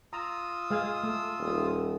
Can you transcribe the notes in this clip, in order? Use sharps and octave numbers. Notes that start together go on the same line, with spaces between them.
F4 A#5 D#6 E6
G#3 F5 G#5
A3
D#1